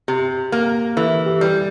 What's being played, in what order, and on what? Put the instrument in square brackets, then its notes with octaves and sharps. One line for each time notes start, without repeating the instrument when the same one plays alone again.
[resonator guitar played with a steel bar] C3 [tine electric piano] G4
[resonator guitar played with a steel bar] A#3
[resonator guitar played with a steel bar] E3 [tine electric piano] A4
[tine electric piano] G4
[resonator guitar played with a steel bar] G3